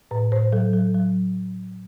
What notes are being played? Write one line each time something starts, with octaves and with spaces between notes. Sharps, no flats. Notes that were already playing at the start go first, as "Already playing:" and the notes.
A2 B4
A2 C5
F#3 A4
F#3 A4
F#3